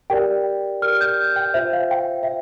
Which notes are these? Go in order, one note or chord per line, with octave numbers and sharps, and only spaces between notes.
G4 A#4 D5 G5
G4 A#4 D5 F6
G6
G5
F4 C5 E5
F5
G5
E5